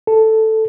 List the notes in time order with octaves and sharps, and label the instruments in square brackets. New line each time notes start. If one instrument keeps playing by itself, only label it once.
[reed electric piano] A4